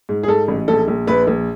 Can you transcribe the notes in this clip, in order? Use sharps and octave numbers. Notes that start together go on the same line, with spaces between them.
G#2
G#4
G#2 A4
A1
A#1 A4
A#1
A#1 B4
A#1